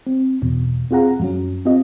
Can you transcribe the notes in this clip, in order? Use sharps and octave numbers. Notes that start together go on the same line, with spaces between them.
C4
E2 B2
C4 F4 G#4 F5 F#5 A#5
F#2 F#3 C#4
C4 F4 G4 D#5